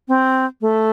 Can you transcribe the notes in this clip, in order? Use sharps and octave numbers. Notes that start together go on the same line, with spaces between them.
C4
A3